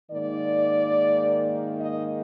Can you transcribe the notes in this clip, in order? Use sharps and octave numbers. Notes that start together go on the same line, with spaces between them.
G#2 D#3 A#3 D5
D#5